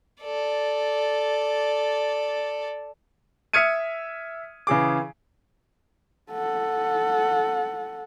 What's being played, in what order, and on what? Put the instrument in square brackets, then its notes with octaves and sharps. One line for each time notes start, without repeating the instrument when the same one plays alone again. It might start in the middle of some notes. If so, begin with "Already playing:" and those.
[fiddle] A4 D5
[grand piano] E5 D#6 F6 G#6 C#7 D#7
C#3 E3 G#4 D6
[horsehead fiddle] A4 F#5